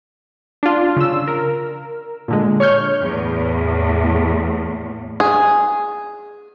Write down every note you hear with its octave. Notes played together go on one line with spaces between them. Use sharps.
D4 F4
C#3 E6
A#4
A#2 D3 G#3
C#5 C#6 F6 G6
E2 A2
G#4